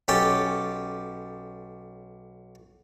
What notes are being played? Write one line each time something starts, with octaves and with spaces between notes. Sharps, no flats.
B1 C#4 G4 A4 A5